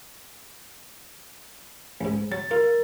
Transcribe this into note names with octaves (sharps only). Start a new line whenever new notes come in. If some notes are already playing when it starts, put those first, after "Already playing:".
A1 G#2
F#3 A6
F4 A#4